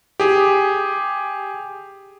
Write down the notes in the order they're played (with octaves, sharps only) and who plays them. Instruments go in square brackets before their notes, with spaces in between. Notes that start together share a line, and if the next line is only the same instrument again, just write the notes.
[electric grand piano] G4 G#4